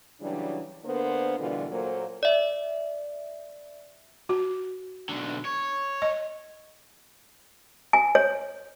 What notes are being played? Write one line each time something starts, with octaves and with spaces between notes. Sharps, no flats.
C#3 E3 F#3 G3 D4
D3 A#3 B3 D4 A#4 C5
D2 B2 D3 E3 G3 F4
A#2 F#3 A#3 A4 C5
D5 E5
F#4
B1 D3
C#5
D#5
G#5
C#5